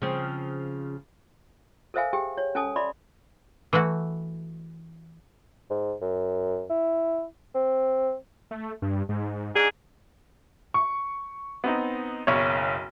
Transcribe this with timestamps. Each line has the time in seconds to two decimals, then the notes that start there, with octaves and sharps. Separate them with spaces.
0.02 C#3 F3 C4
1.94 A4 A#4 C5 E5 F5 G#5
2.13 G4 G#4 G5
2.38 C#5
2.55 C#4 A4 G#5 A5 D#6
2.76 D5 E5 B5 C6 D6
3.73 E3 A3 E4 F#4
5.70 G#2
6.01 F#2
6.70 E4
7.55 C4
8.51 A3
8.82 G2
9.09 G#2
9.54 G#2 D4 G#4
10.74 C#6
11.64 B3 C4 D#4
12.27 F#1 B1 C#5